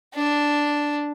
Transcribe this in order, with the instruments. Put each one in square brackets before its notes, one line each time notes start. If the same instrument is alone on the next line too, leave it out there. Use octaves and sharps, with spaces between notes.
[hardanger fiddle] D4